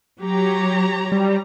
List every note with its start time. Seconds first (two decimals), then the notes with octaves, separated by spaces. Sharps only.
0.20 F#3 G4 C#5 A#5
1.12 G3